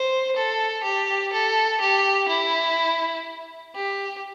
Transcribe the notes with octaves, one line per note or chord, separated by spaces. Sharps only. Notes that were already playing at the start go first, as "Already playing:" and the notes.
Already playing: C5
A4
G4
A4
G4
E4
G4